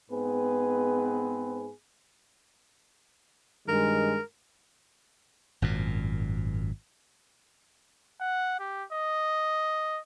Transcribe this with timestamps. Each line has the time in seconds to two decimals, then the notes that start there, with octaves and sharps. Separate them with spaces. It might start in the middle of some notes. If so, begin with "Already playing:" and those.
0.11 G#2 B3 C4 G#4 B4
3.68 G2 D#3 G#3 A#4
5.62 G#1 F#2 A#2
8.20 F#5
8.59 G4
8.92 D#5